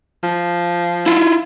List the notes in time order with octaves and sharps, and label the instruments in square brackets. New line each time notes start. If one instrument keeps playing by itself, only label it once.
[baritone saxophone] F3
[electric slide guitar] E4 F4